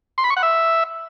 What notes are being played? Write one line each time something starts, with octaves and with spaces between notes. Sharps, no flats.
C6
B5
C#6
F#5
E5